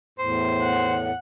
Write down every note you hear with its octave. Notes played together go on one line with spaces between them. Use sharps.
E2 A2 C5
F#5